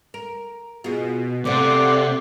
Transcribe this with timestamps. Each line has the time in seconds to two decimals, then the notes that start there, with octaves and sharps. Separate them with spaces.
0.14 A#4
0.84 B2 F4 F#4 G#4
1.45 C3 A3 A#3 D5 F#5 C6 D6